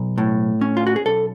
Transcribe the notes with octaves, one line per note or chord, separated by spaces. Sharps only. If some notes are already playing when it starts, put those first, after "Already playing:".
Already playing: B1
A2
C#4
F4
F#4
G#4
B1 A4